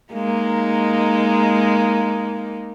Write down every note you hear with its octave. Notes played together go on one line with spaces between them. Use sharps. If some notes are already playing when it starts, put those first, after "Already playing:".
G#3 A#3 D#4